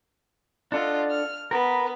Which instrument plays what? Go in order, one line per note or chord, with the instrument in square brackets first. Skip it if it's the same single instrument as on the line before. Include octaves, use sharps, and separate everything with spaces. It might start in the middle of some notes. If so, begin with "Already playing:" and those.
[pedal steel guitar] D4 A4 F#5 [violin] F4 D#5
[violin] F6
[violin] B3 [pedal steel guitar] A#4 B5